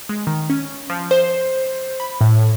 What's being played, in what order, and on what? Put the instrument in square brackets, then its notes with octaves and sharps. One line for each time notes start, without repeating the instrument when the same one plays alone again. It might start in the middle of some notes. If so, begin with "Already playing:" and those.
[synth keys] G#3
D#3
C#4
F3
C5
B5
A2